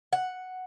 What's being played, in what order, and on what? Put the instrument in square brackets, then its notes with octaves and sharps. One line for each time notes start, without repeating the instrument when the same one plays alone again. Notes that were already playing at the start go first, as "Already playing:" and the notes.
[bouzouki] F#5